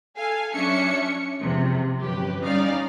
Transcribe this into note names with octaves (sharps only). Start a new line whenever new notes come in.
A4 F5 G#5
F#3 C#4 D4 E5 C#7
E2 C3 F3
G1 F#2 G4 B4
G3 C#4 D#4 D5 F5